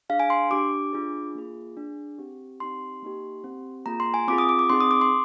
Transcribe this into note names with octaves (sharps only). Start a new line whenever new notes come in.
D4 G#4 F5
G#5
C6
D4 G4 D6
D4 F4 G#4
A#3 F4 G#4
D4 G#4
C4 G4
C4 D#4 G4 C6
A#3 D#4 G4
C4 G4
A#3 F4 G#4 A#5
C6
G#5
C4 F4 G#4 D6
D#6
D6
D6
C4 D#4 G#4 C6
D#6
D6
C6